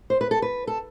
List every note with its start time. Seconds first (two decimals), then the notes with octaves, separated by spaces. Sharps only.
0.10 C5
0.21 B4
0.31 A4
0.42 B4
0.67 A4